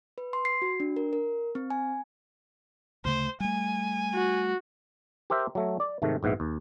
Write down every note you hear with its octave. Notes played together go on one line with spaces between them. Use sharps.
B4
C6
C7
F#4
D4
A#4
A#4
C4
G#5
D2 C#3 A3 C5
G3 A3 G#5
F#4
G4 A#4 C5 E5
F#3 A3
D5
G#2 C3 D#3 A3
A#1 G#2 B3 E4
D#2